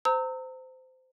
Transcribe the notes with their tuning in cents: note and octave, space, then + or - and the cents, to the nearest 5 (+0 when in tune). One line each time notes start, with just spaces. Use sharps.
C5 -25 A#5 -35 E6 -30